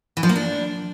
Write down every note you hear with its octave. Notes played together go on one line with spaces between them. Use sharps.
E3
F3
A#3
D4